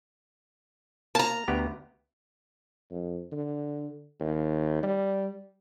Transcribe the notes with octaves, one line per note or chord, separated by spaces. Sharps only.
A#3 A5 A#5
D2 B3 G4
F2
D3
D#2
G3